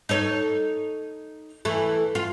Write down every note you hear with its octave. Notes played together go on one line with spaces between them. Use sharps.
D#4 A4 C#5
E3 A3
F4